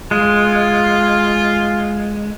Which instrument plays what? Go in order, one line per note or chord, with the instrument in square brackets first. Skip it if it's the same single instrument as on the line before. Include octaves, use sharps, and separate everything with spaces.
[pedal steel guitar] G#3 [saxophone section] F4